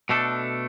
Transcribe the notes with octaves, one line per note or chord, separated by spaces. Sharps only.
B2 A3 D4 A4